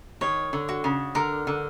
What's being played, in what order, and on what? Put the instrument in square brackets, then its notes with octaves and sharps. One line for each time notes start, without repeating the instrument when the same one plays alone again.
[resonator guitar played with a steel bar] D#3 [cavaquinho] C#5
[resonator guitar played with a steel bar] D3
[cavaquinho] F#4
[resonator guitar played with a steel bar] C#3
[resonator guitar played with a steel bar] D3 [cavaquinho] A#4
[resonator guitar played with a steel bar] D3